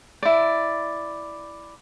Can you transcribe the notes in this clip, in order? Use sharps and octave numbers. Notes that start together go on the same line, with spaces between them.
E4 D5